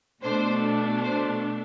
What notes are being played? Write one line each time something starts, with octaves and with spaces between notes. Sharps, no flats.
B2 A3 D4 C5
C5